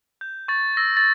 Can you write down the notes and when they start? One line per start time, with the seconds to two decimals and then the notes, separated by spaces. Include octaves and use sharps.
0.21 G6
0.48 C#6 A6
0.77 E6 A#6
0.97 A6